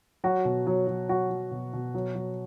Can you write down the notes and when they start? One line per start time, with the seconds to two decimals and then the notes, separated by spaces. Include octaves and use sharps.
0.24 F#3 F#4
0.45 B2
0.67 F#3
0.87 F#3
1.09 F#3 F#4
1.30 F#3
1.51 B2
1.73 B2
1.94 F#3
2.15 F#3